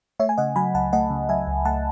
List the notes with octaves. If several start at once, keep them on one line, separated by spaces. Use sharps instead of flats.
A3 C#5 E5
G#5
C#3 D#5 F#5
F#3 G#5 B5
C#2 F#5 A5
A3 D#5 F#5
C#3
F#3 E5 G#5
C#2
A3 F#5 A5